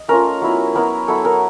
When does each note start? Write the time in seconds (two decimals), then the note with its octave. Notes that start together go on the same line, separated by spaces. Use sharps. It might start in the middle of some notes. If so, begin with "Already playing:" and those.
Already playing: D#5
0.08 A3 C#4 F4 A#4
0.42 F#3 B3 E4
0.74 F#3 B3 E4 A#4
1.08 F#3 B3 E4 A4
1.25 A#4